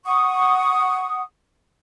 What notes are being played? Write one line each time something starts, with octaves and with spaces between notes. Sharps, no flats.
F#5 C#6 D#6